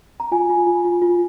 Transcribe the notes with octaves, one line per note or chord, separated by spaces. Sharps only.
A#5
F4 G#5
F4
F4
F4
F4